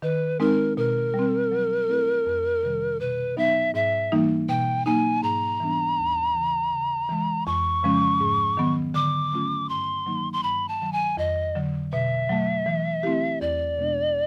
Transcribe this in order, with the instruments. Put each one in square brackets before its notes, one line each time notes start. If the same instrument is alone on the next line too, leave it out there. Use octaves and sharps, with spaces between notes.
[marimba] D#3 [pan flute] B4
[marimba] G#3 C4 D#4 [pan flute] A#4
[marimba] B2 [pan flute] A#4
[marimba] G3
C4
F#3
A3 C4 E4 A4
F2
C3 D#3 G3
[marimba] B2 [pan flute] B4
[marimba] F#3 B3 D#4 [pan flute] E5
[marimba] G#2 [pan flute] E5
[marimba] E3 G3 A#3 D#4
[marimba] B2 [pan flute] G5
[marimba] F#3 A#3 D#4 [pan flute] G#5
[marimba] G#2 [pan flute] A#5
[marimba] E3 G3 B3 D4
D#2
C#3 E3
C#3
E3 G#3
[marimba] F2 [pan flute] C#6
[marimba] C#3 F3 G#3 C#4
G#2
D#3 F#3 B3
[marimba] D3 [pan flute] D6
[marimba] F#3 A3 C#4 F4
[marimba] G2 [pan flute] C6
[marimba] D#3 F#3 A#3 D#4
[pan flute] C6
[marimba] G2 [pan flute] B5
[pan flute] A5
[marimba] D#3 F#3
[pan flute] G#5
[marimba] F2 [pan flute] D#5
[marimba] D3 F#3
[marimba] B2 [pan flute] E5
[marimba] F#3 A3
E3
A3 C4 E4 G4
[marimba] E2 [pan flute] D5
[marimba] B2 G#3 B3 D4